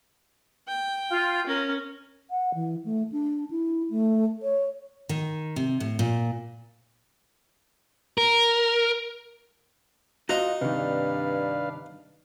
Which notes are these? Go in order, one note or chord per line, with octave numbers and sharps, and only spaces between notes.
G5
F4
C#4 A#4
F#5
E3
A3
D4
E4
A3
C#5
D#3
C3
A2
A#2
A#4
D#4 F4 F#4 C5 D#5
G2 C3 D#3 D4 B4 F5